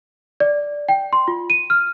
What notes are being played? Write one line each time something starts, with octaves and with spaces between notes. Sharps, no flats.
D5
G5
C6
F4
D#7
F6